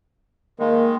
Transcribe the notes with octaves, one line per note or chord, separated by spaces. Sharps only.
D#3 G#3 A#3